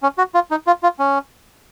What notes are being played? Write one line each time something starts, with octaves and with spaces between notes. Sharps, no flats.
C#4
F#4
F4
D#4
F4
F4
C#4